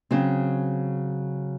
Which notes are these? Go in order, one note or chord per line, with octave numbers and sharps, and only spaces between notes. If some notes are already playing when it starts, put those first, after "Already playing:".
C#3 F#3 C4